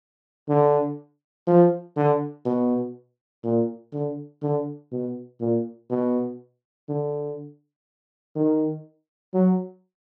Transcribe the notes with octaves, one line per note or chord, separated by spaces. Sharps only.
D3
F3
D3
B2
A#2
D3
D3
B2
A#2
B2
D3
D#3
F#3